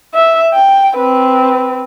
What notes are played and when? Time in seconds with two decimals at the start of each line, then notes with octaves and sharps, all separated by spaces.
0.14 E5
0.54 G5
0.96 C4 B4